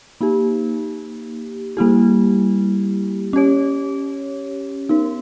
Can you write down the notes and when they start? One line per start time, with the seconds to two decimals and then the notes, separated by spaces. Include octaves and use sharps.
0.21 A#3 D#4 G4
1.77 G3 A#3 E4 G4
3.33 C#4 G4 C#5
4.89 B3 D#4 A#4